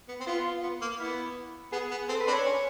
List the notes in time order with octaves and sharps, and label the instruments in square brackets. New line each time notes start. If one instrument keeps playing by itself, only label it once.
[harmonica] B3
C4
[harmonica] B3 [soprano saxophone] F4
[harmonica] B3
A#3
[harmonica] B3 [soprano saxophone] E4
[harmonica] B3 [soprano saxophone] G#4
[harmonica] B3
[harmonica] C4 [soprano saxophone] A4
[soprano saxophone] B4
[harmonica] C4 D4
[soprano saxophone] C#5
[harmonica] C#4